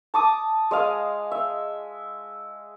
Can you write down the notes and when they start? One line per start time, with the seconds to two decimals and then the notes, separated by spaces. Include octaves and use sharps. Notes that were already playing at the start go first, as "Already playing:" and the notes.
0.14 A5 D6 D#6
0.71 G#3 D#5 F5
1.31 E5